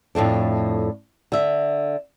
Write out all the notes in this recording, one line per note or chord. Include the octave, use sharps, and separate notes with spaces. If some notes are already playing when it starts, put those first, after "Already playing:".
F2 A2 A3 D4
D3 E5